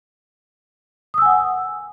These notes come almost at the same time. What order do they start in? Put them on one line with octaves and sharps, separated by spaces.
D#6 E6 G#5 F#5